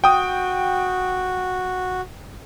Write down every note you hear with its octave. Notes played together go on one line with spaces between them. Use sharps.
F#4 G5 D#6